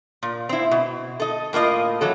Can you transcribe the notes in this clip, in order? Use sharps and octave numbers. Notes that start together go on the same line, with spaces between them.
A#2
C4 E4
B2
A4 D#5
A2 A#3 F4 D#5
E3 F#3 A4